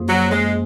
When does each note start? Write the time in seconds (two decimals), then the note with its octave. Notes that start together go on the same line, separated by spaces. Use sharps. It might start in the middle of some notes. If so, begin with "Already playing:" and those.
Already playing: F#2 F3 A#3 F4 G#4
0.08 F#3
0.30 G#3